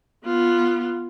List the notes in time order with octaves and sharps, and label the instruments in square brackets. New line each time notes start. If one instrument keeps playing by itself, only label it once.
[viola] B3 F4